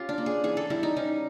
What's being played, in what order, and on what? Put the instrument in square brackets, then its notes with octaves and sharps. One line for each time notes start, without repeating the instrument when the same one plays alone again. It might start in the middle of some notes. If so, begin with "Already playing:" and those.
Already playing: [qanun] C#4 F4 G4
D4
A#3
G#4
E3 G#4
A4
G3 E4
D#4
C#4 D#4